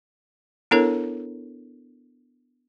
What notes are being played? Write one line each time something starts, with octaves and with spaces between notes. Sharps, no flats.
B3 D4 E4 A4 A#4 C#5